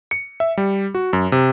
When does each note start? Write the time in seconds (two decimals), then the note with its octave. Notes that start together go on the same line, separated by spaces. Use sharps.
0.11 C#7
0.40 E5
0.57 G3
0.95 F#4
1.13 F#2
1.32 C3